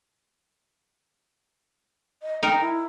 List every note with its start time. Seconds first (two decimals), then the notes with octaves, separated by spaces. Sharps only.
2.23 D#5
2.43 D#4 A#4 G5
2.61 E4